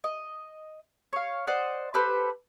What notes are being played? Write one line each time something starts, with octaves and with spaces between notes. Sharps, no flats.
D#5
C#5 F5
C5 D5 D#5 F#5
G4 A4 B4 C5